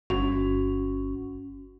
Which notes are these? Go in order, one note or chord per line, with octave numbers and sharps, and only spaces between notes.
G1 C#4 F#4